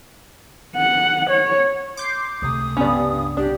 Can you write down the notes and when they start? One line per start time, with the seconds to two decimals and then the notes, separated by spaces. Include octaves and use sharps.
0.77 F#5
1.29 C#5
1.97 C6 D6 G6 C7
2.42 C#2 C3 A3 D#6
2.77 C#2 G2 C#3 B3 C#4 D5
3.37 C2 D4 G4